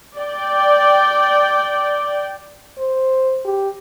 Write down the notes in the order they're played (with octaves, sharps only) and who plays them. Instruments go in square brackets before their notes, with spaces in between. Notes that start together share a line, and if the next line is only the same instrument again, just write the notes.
[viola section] D5 G5
[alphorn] C5
G4